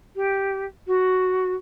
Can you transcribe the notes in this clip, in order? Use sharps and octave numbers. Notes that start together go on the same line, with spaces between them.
G4
F#4